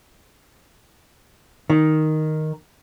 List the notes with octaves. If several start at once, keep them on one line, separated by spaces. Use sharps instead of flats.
D#3